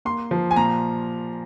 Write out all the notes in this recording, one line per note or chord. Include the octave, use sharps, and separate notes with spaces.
A#3 C6
F3
G#5
A#2 A#5